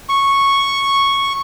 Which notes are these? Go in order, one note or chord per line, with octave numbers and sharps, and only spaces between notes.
C#6